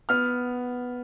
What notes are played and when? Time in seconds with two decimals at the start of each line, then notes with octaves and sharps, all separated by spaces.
0.09 B3 F6